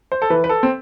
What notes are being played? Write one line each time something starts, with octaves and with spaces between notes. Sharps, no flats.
C5
A4
E3 B4
B4
A4
C4